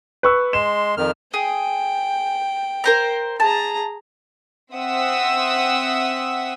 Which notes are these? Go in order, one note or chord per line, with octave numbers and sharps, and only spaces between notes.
B4 C#6 E6
G#3 C6 E7
F2 D#3 F6
G#4 G5
A#4 C5 A#5
G#4 A5 A#5
C4 E5 F#5 D#6 E6